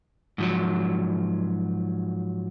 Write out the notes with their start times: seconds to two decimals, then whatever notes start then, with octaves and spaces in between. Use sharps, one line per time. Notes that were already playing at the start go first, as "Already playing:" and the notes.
0.38 G#2 F3 F#3